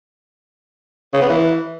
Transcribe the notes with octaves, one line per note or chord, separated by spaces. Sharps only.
C#3
B3
E3